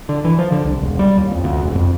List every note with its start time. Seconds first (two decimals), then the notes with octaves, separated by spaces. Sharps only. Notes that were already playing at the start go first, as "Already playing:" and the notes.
0.09 D3
0.25 E3
0.39 F3
0.52 D3
0.65 C2
0.81 E1
0.99 G3
1.18 D#2
1.31 F2
1.44 D2
1.61 E1
1.75 F2